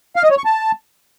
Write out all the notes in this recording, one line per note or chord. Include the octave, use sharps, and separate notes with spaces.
F5
D#5
C#5
C#6
A5